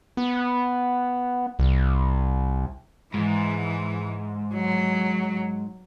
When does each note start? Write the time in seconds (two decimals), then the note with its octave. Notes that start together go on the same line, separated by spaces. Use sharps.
0.17 B3
1.59 C2
3.14 G#2 E3
4.55 F#3